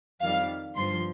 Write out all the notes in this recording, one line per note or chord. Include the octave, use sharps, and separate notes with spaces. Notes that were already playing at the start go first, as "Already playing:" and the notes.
F2 D#3 G3 F5
G1 G2 F3 C6